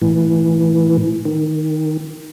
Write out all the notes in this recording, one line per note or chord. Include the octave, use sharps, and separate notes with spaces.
A2 E3
D#3